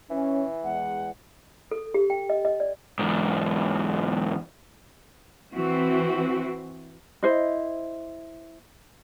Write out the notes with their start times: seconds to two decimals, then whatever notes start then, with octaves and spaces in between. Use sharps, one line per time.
0.10 E3 C#4
0.64 E2 G#3 F#5
1.71 A4
1.94 G4
2.10 G5
2.30 D#5
2.45 D#5
2.60 D5
2.99 E2 G#2
5.53 E3 C4 F#4
7.23 E4 C5 D#5